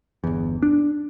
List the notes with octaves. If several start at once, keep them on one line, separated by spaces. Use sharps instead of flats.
G1 E2
D4